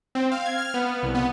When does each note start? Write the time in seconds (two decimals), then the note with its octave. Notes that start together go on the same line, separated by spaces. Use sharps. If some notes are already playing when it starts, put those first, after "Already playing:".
0.15 C4
0.32 F5
0.46 G#6
0.58 F6
0.74 B3
1.03 C2
1.15 B3